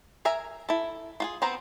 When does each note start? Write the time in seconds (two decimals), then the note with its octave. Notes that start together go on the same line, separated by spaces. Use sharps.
0.25 A#4 E5 G#5 A#5
0.69 E4 A4
1.20 F4 F#4 G#4
1.42 B3 C4 C5 A#5